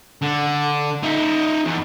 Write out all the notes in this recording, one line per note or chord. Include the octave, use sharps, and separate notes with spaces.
D3
D#4 E5
E2